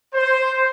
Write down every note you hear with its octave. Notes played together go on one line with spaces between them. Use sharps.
C5